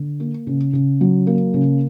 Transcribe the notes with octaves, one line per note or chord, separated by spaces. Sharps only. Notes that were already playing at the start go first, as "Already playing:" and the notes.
Already playing: D3
A#3
C#3
C#3
F#3
A#3
C#3